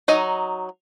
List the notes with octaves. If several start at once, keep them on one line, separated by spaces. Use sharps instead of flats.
F#3 D#4 D#5